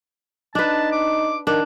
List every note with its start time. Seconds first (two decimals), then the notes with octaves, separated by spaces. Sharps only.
0.55 D4 D#4 B4 A5
0.92 D6
1.47 D#3 D4